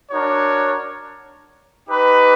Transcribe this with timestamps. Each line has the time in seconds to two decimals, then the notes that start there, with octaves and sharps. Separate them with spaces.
0.11 D4 F#4 A#4 C#5
1.89 D#4 G4 B4